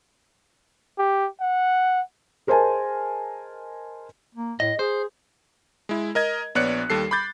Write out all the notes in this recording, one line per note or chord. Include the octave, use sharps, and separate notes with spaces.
G4
F#5
G#4 A#4 C5 D#5 G#5 A5
A#3
A2 D#5
G#4 C5
G#3 E4
A#4 D#5 G#6
A#1 B3 C#5 D5 F#6 C#7
D#2 G3 A4 C7
B5 D6 G6 A6